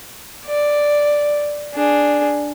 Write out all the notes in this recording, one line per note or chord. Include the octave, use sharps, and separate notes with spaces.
D5
D4 G#4